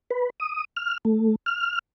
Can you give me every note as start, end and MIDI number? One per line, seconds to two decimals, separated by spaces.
0.10 0.30 71
0.40 0.65 87
0.77 0.98 89
1.05 1.35 57
1.46 1.79 89